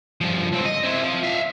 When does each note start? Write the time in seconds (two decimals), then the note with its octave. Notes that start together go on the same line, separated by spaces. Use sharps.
0.21 G2 F3
0.52 C#2 C4
0.65 D#5
0.83 C4 E4
1.03 F3
1.23 E5 F5